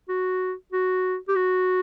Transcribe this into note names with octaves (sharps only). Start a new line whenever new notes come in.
F#4
F#4
G4
F#4